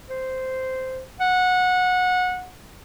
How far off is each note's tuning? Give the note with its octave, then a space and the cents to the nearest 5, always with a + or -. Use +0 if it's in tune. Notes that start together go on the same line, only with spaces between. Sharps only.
C5 -10
F#5 -20